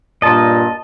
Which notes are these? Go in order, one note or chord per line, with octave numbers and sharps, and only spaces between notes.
G2 A#2 D#5 A5